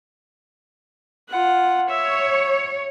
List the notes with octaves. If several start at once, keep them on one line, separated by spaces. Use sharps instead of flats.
F4 F#5
C#5 E5